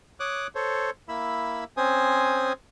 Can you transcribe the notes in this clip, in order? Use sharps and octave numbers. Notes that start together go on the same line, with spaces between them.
C#5 D6 D#6 F#6
A4 C5 C#5
A#3 E4 B5 E6
C4 C#4 C5 G#5 D#6